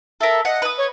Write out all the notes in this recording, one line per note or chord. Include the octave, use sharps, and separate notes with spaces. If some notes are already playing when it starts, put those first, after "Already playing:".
A4 A#4 E5
D#5 F#5
B4 D#6
C#5